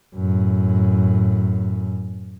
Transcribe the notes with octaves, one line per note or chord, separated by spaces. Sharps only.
F#2 A2